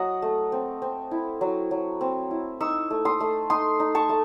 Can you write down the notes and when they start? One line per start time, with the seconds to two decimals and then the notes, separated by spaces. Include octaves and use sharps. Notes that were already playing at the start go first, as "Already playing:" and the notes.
Already playing: F#3 D#5 F#5
0.22 A3
0.52 C4
0.82 C4
1.11 E4
1.41 F#3
1.71 F#3
2.01 C4
2.31 E4
2.60 D#4 C#6 E6
2.90 A3
3.05 C6 D#6
3.20 A3
3.50 D#4 C6 D#6
3.80 D#4
3.95 A5 C#6
4.09 A3